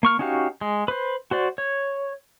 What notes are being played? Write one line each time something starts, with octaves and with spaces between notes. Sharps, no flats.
A#3 C#6 F6
C#4 D#4 F#4 G4 F5
G#3
B4 C5
F#4 C5 D5
C#5